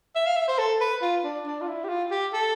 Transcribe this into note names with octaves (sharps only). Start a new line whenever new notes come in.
E5
F5
E5
C5
A4
B4
F4
D4
D4
F4
E4
G4
F4
G4
A4